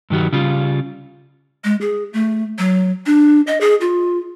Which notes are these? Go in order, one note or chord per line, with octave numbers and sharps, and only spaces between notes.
G2 D#3 F#3 G3
C#3 G3 F4
G#3
G#4
A3
F#3
D4
D#5
G#4
F4